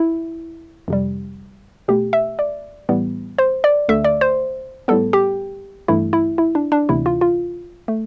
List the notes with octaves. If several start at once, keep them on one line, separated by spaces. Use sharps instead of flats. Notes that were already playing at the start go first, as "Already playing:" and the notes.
Already playing: E4
F2 C3 G3
B2 A3 G4
E5
D5
A2 E3 G3 B3
C5
D5
D2 D3 A3 E5
D5
C5
A2 G3 B3 A4
G4
G2 E3 A3 E4
E4
E4
D4
D4
D2 C3 E3 B3 E4
F4
F4
A3